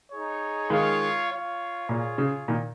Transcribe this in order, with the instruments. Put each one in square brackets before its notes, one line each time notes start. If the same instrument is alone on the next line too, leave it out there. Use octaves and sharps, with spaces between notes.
[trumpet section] D#4 G#4 C#5
[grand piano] D#3 G#3 [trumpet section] F4 C#5 F5
[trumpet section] F4 C#5 F5
[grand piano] A#2 [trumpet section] F4 G#4 C#5
[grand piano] C#3
A#2 D#3